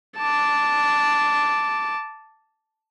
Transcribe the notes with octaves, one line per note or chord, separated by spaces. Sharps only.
A5 D6